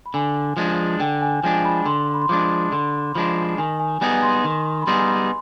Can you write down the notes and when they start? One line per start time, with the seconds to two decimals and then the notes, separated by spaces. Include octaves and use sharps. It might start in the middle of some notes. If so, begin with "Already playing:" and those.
0.06 B5
0.14 D3 G#5
0.57 F3 G#3 D4
1.00 D3 G5
1.22 G#5
1.43 F3 G#3 D4 G#5
1.65 B5
1.85 D3 C6
2.14 B5
2.22 C6
2.29 F3 G#3 D4 D6
2.72 D3 C6
3.15 F3 G#3 D4 B5
3.58 D#3 G#5
3.80 G#5
4.01 G3 B3 D#4 G#4 G#5
4.22 C6
4.44 D#3
4.82 B5
4.87 G3 B3 D#4 G#4 C6